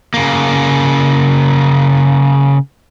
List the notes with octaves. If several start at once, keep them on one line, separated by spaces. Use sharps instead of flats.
C#3 A#3